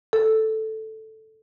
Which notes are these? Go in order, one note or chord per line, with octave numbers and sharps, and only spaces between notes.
A4